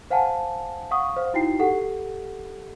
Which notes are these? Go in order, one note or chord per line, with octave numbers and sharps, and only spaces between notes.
C5 F5 F#5 G#5 A5
F5 F#5 C#6 D#6
C5 F5
D#4 E4 F#4 G5 C7
G4 A4 F#5